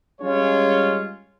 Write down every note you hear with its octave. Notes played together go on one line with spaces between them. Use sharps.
G3 G#3 C#4 F4 C#5